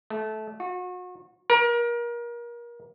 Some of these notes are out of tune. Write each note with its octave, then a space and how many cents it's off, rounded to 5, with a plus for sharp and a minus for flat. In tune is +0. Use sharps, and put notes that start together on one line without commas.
A3 -20
F#4 -35
A#4 +30